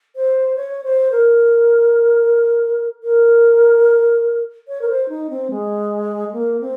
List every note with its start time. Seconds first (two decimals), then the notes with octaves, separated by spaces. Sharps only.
0.16 C5
0.57 C#5
0.84 C5
1.12 A#4
3.03 A#4
4.68 C#5
4.81 A#4
4.89 C5
5.09 D#4
5.30 C4
5.51 G#3
6.33 A#3
6.61 C4